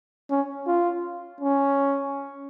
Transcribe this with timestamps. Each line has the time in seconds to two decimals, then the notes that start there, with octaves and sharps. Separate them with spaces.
0.30 C#4
0.67 F4
1.40 C#4